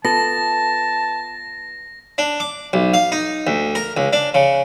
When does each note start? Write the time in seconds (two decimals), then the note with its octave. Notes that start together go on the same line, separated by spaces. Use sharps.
0.05 B3 F4 A4 A5 A#6
2.18 D4
2.40 D6
2.73 B1
2.94 F5
3.12 D#4
3.47 D2
3.75 A#4
3.97 C#2
4.13 D4
4.34 C#3